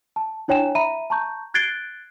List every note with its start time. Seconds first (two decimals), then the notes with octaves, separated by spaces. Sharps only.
0.16 A5
0.48 D4 E4 C#5 G5 G#5 E7
0.75 E5 A#5 B5 D#7
1.10 A5 A#5 C#6 G6
1.54 F#6 G#6 A6 C7 D7 G7